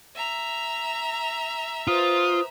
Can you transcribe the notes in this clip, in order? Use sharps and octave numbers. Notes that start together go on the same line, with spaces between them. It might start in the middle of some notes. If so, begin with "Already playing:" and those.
E5 A#5
F4 B4 C5 D#6